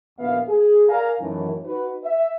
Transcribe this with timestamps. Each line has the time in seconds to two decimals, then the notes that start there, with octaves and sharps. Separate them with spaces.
0.19 A#1 D#2 B3 E5 F5
0.48 G#4
0.89 A#4 D5 F5 G#5 A#5
1.20 F#2 A2 D#3 E3
1.64 D#4 F#4 B4
2.04 E5